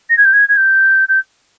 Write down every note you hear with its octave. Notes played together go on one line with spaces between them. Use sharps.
A#6
G#6
G6
G#6
G#6
G6
G6